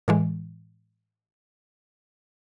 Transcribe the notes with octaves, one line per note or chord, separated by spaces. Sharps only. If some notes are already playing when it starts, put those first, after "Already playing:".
A2 E3 G#3